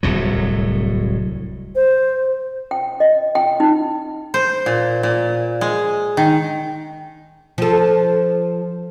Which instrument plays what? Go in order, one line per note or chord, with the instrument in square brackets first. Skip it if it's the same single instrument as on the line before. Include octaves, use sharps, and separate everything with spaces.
[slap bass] D1 C2 A2 F#3
[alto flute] C5
[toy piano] G5
D#5
G5
D#4
[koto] C5
A#2
A#2
G#3
D#3
[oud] F3 A4